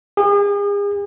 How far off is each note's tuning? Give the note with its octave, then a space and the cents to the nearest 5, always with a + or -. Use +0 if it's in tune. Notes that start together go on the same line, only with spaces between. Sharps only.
G#4 -40